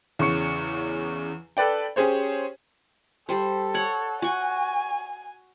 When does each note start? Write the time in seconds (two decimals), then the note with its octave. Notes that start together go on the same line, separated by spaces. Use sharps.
0.19 E2 C#3 C#6 C#7
1.57 A4 B4 D5 G5
1.96 C#4 G4 G#4 C5 C#5
3.29 G3 A4 C5
3.74 C#5 F#5
4.22 F#4 G#5 C#6